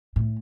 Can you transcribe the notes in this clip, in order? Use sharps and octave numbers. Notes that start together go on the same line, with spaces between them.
A2